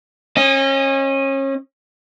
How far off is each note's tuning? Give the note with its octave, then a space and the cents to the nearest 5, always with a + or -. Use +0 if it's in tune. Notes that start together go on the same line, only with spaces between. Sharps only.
C#4 -30 D#5 -5